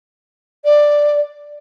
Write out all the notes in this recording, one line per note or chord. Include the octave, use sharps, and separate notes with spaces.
D5